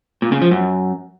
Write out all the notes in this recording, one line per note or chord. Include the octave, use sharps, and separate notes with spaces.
A#2
C#3
F3
F#2